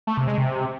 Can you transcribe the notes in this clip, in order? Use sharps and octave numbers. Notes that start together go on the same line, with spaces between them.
A3
C3
G#3
C3